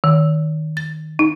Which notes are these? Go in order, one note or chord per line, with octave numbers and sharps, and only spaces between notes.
D#3
A6
D#4